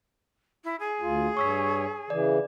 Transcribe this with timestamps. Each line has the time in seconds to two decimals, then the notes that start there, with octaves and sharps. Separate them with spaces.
0.64 E4
0.80 G#4
1.01 D2 F4
1.37 G2 C#5 C#6 E6 B6
2.10 C#3 E3 D5